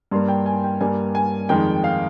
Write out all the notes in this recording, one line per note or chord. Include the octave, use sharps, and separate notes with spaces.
G2 G3 A#3 C6
G5
G#5
G5
G2 G3 A#3 G#5
G#5
F2 D#3 G#3 G5
F5